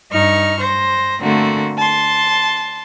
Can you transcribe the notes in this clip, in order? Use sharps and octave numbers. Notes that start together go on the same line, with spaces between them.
G2 D#4 C#6 F6
C5 A#6
D3 A3 A#3 C4 F#4
A5 C6